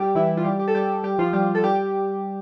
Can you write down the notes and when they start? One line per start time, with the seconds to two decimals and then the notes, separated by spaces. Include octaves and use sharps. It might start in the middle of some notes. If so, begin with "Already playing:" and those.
Already playing: G3 G4
0.15 E3 E4
0.37 F4
0.45 G3 G4
0.59 G4
0.68 A4
0.75 G3 G4
1.03 G3 G4
1.18 F3 F4
1.33 G3 G4
1.55 A4
1.63 G3 G4